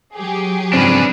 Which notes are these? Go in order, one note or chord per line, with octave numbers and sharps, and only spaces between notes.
F#3 G4 G#4
G#2 C#3 F3 C4 D4 B4